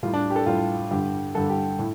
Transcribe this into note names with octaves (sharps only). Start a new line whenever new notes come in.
A2 G3 F4
D4
G4
A4
A2 G3 F4
G2 D3 G3 G4
G2 D3 G3 A4
G4
A2